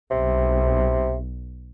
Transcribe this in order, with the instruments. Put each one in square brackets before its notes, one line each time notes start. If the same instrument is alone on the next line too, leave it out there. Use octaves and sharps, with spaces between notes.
[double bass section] B1 [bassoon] C3